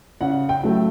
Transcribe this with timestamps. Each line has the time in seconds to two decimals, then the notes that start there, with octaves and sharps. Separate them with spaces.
0.21 C#3 F#5
0.49 G5
0.63 F#3 A3